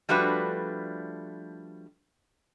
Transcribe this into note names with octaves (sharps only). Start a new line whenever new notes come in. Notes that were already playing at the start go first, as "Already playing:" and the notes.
F3 G3 A3 D4 F#4 B4